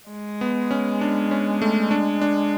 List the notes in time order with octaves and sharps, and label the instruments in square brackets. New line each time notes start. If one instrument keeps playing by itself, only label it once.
[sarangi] G#3
[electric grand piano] B3
C#4
D4
C#4
A3
D4
D4